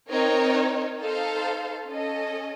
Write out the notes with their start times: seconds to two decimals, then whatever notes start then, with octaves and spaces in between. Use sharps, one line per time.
0.10 C4 D#4 A#4 C#5
1.00 D#4 A4 C5 F5 A5
1.88 C#4 A4 D#5